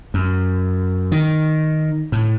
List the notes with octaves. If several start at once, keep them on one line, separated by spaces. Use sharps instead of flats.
F#2
D#3
A2